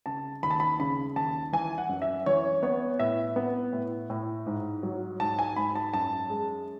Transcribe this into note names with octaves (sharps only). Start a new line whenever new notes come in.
C#3 A5
D#2 B5
A5
B5
C#3 B5
D#2 A5
E3 G#5
F#5
F#2
E5
E3 C#5
B3 C#5
A2 E5
B3
A2
A2
G#2
F#3
G#2 A5
G#5
G#2 B5
A5
F#2 A5
G#3